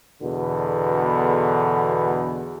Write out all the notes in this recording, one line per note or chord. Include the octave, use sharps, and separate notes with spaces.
E2 B2 D3